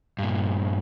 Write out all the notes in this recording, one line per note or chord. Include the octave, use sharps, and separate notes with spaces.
G2 A#2